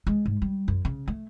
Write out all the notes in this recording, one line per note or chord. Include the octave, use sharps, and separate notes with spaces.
G#3
G#2
G3
F#2
C#3
A3